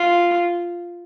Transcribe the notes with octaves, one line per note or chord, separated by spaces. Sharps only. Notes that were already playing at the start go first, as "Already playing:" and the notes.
Already playing: F4